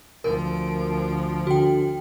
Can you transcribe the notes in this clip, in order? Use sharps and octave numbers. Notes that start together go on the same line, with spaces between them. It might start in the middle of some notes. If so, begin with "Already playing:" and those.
D2 F3 A#4 D7
D7
D3 F#4 G5